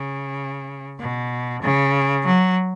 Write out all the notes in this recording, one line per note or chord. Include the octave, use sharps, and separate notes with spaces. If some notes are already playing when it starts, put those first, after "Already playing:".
Already playing: C#3
B2
C#3
F#3